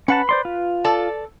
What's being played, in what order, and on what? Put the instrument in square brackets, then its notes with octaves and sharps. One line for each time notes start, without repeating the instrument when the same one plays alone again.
[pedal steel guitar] C#4 F#5 A5 [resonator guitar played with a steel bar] B4
[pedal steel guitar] C5 D5 C6
F4
[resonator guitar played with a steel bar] A4 D5 A5